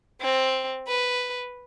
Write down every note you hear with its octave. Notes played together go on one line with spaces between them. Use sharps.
C4
B4